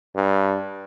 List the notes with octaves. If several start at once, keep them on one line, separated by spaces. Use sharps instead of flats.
G2